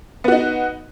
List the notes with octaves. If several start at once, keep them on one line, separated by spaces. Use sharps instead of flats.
B3 D#4 F#4